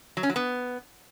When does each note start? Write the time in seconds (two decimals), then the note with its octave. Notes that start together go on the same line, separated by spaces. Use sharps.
0.17 F#3
0.23 C#4
0.29 F#3
0.36 B3